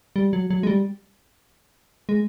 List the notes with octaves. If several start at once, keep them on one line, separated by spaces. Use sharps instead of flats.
G3
F#3
F#3
G#3
G3
G#3